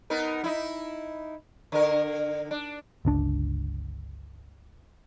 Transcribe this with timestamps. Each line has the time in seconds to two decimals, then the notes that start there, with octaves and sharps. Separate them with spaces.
0.10 B3 D#4 A#4
0.44 D#4 E4
1.72 D3 A#4
2.51 D4
3.05 G1 C#2 D4